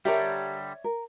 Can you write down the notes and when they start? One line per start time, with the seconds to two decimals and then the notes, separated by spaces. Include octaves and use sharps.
0.05 D3 G3 G4 A#4 C#5 D5 E5
0.84 A#4